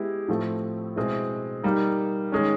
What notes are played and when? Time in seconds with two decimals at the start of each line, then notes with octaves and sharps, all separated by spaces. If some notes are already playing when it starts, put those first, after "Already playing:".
Already playing: G#3 B3 E4 G4
0.28 A2 F3 A3 C4
0.96 B2 G#3 C4 E4
1.63 G3 A#3 D#4
2.32 D#3 G#3 C#4